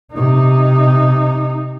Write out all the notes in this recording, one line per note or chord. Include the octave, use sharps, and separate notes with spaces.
C3 D#4